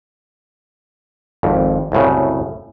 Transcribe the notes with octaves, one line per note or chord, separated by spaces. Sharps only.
G#1 F2
C2 F#2 A2 C#3